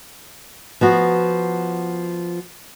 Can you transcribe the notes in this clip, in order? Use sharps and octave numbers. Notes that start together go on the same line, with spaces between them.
F3 B3 F#4